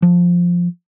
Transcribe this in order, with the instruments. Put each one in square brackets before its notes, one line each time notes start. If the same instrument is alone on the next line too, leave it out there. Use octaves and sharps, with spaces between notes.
[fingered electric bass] F3